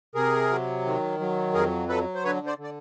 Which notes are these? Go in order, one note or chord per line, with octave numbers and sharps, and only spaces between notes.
C3 G#4 A#4
F#3
D#3
F#3
F2 G#4 A#4
F#3 A4 B4
C5
D3 B4 C#5
C5 D5
D3
D5